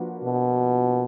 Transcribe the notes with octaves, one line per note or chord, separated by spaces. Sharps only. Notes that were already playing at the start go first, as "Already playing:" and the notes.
Already playing: F3 A#3 D4 F#4 B4
B2